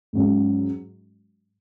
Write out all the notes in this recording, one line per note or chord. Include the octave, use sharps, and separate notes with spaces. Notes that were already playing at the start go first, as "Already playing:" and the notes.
G#2 F#3 C#4 F#4